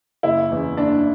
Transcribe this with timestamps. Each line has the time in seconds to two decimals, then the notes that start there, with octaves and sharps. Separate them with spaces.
0.23 F#1 E4
0.51 E2 C#3
0.77 F#1 D4